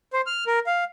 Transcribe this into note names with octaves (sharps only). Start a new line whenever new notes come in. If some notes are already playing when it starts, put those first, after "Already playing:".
C5
F6
A#4
F5